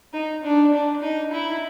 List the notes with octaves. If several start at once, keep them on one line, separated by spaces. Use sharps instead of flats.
D#4
D4
D4
D#4
E4